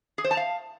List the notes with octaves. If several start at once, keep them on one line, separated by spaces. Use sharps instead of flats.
G#4
C5
A5
F5